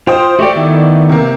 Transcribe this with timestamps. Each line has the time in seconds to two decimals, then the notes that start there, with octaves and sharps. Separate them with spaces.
0.07 F4 C5 G5 D#6
0.39 A3 F#4 G4 D5 G5
0.56 D#3 B3 E4
1.09 C3 A#3